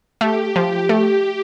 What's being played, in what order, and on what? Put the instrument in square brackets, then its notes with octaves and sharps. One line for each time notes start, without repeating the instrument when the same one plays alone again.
[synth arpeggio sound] A3 [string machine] G4
[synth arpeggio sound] F3
A3